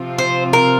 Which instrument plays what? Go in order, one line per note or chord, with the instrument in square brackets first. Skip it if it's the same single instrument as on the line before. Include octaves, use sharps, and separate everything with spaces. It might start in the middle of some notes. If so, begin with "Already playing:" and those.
Already playing: [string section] C3 F3 C4 F4
[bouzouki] C5
A#4